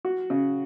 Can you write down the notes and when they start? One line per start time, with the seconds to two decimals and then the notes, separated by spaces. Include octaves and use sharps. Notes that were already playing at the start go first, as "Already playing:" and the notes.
0.05 F#4
0.30 C#3